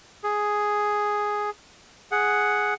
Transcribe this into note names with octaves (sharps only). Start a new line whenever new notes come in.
G#4
G#4 F#5